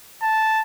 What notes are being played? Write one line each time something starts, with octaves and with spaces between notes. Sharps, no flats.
A5